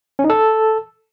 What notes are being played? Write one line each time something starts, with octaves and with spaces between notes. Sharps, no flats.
C#4
D#4
A4